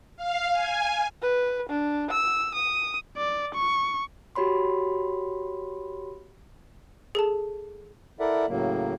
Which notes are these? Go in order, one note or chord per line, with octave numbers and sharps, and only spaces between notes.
F5
G#5
B4
D4
E6
D#6
D5
C#6
F#4 G4 C#5 B5 C6
G#4 A4 A5
E4 A4 A#4 D5 E5 F#5
A2 C#3 F#3 A#3